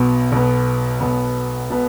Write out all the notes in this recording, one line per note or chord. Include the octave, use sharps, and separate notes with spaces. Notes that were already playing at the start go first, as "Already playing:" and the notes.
Already playing: B1 B2 B3
B1 B2 B3
B1 B2 B3
B2 B3